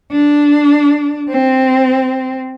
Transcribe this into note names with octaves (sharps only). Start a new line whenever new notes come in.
D4
C4